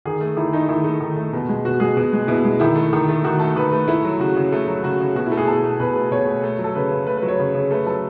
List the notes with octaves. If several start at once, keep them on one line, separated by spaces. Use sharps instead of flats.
D#3 G#4
A3
D#3 E4
A3 D#4
D#3 E4
A3
D#3
A3
B2
G#3
B2 F#4
G#3 G#4
B2
G#3
B2 E4
G#3
D#3 E4
A3
D#3
A3
D#3 F#4
A3 A4
D#3 B4
A3
A3 E4
F#3
C#3 F#4
C#3
A3
F#3
C#3 F#4
C#3
B2 F#4
E4
A3
G#4
B2 A4
A3
B2 B4
A3
B2 C#5
A3
A3
F#3
A4
C#3 B4
C#3
A3 B4
B4
F#3
C#5
C#3
C#3
A3 B4
F#3 A4